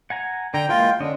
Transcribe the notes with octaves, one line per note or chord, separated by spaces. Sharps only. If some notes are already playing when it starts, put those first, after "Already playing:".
F#5 G#5 A#5
D3 G5 A#5
E3 G#3 A#3 F4 G5
D3 C#4 D4 D#5